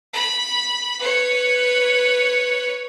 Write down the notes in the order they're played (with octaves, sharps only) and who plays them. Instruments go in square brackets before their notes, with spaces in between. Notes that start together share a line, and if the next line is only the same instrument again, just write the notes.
[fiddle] B5
B4 C#5